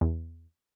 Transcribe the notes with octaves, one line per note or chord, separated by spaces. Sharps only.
E2